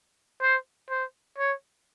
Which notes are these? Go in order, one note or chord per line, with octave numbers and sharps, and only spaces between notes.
C5
C5
C#5